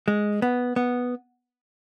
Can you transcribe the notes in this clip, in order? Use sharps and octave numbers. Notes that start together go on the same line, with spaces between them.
G#3
B3
B3